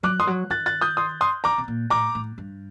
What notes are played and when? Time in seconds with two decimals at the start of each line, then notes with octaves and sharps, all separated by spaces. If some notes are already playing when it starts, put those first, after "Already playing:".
0.03 F#3 D6 F#6
0.19 D#3 C6 D#6
0.27 F#3
0.50 D#3 F#6 A6
0.66 F#6 A6
0.81 D#6 G6
0.97 C6 D#6
1.21 C6 D#6
1.44 D3 A#5 D6
1.58 C3
1.68 A#2
1.90 A2 A#5 D6
2.15 A2
2.38 G2